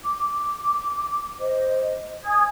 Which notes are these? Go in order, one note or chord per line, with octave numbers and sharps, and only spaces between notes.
D6
C5 D#5
G#5 D#6 G#6